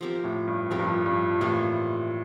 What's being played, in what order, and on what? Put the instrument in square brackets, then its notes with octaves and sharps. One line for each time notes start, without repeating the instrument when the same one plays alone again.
[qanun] F3 C4 G4 A#4
[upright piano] A2
G2
[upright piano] F2 [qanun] F3 C4 G4 A#4
[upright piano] G2
F2
G2
[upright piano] A2 [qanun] C3 E3 A#3 F4